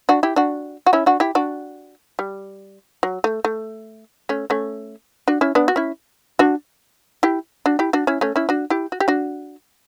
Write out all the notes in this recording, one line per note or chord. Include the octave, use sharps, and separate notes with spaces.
D4 F#4
E4 G4
D4 F#4
F#4
C#4 E4
D4 F#4
E4 G4
D4 F#4
G3
F#3
A3
A3
A3 C#4
A3 C#4
D4 F#4
C#4 E4
B3 D4
F#4
C#4 E4
D4 F#4
E4 G4
D4 F#4
E4 G4
D4 F#4
C#4 E4
A3 C#4
C#4 E4
D4 F#4
E4 G4
F#4
G4
D4 F#4